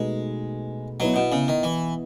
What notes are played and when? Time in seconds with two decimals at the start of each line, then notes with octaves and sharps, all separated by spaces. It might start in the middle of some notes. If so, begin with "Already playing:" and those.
Already playing: B2 G#3 A3 D#4 G#4 B4
1.00 F#3 B3 E4 B4 D#5
1.16 B2
1.32 C#3
1.48 D#3
1.63 E3